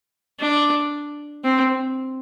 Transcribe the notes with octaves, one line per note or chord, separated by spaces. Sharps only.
D4
C4